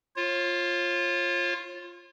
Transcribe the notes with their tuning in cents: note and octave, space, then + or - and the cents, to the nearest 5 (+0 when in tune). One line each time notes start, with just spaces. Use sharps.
F4 +0 C#5 -40